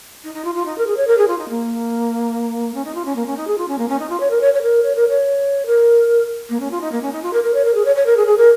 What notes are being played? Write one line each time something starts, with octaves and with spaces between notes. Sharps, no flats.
D#4
D#4
F4
F4
D#4
A#4
G#4
C#5
A#4
G#4
F4
D#4
A#3
C#4
D#4
F4
C#4
A#3
C#4
D#4
G#4
F4
C#4
A#3
C#4
D#4
F4
C#5
A#4
C#5
C#5
A#4
C#5
A#4
C#5
A#4
A#3
C#4
F4
D#4
A#3
C#4
D#4
F4
A#4
A#4
C#5
A#4
G#4
C#5
C#5
A#4
G#4
G#4
A#4